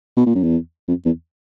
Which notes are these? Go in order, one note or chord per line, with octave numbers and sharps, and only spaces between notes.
B2
A#2
F#2
E2
F2
E2